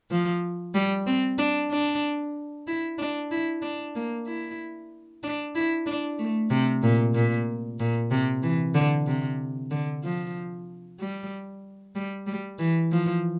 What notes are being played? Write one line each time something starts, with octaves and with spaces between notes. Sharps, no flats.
F3
G3
C4
D4
D4
E4
D4
E4
D4
A#3
E4
D4
E4
D4
A3
C3
A#2
A#2
A#2
C3
E3
D3
C3
D3
F3
G3
G3
G3
E3
F3